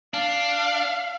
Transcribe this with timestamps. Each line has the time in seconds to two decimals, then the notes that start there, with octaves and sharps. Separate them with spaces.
0.14 D4 F5